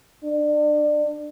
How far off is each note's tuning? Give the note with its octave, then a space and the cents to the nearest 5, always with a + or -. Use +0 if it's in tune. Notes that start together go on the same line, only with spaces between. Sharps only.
D4 +25